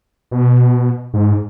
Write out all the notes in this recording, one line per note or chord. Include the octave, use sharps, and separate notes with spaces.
B2
G#2